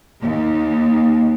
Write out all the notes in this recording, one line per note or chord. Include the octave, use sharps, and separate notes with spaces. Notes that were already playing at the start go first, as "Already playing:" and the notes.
D#2